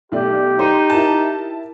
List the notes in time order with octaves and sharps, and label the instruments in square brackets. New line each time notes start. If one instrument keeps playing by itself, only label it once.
[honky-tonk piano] B1 A3 D5 [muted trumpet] G4
[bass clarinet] D#4 [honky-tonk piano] C5
[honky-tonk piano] E4 A#4 A5